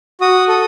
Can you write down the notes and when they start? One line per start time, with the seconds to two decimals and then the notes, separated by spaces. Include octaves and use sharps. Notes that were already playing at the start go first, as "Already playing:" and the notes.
0.21 F#4 D#6
0.48 A4 D#6